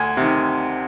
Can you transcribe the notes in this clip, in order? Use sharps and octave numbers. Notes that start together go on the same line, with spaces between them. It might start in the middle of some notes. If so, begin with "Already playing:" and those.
Already playing: D2 G#5
C3 D#3